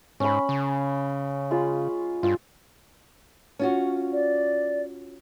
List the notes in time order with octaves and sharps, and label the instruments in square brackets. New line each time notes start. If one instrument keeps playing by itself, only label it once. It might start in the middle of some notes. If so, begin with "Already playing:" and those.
[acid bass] G#2 [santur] C#4 B5
[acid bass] C#3
[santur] G#3 F4 B5
[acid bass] G2 [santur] F4
[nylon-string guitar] C#4 F4 F#4
[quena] D5